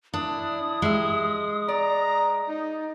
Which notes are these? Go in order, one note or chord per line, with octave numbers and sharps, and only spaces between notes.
D4 E4 D#6
G#3 G4 E5
D5 A#5
D#4